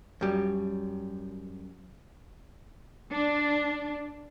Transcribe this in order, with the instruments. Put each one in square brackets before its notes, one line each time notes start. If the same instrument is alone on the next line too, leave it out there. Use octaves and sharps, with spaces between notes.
[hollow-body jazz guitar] F#2 G3
[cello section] D4